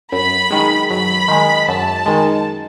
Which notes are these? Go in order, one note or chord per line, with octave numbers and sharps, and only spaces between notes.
F#2 B5
D#3 G#3
F#2 B5
D#3 G#3
F#2 A5
D#3 G#3